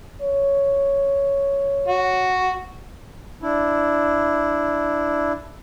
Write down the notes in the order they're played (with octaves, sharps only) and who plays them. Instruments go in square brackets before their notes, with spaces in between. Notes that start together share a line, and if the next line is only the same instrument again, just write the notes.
[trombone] C#5
[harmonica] F#4
[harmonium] D4 E4